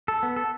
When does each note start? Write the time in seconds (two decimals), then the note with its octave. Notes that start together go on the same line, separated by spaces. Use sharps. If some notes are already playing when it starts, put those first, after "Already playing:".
0.08 A4
0.23 B3
0.36 A4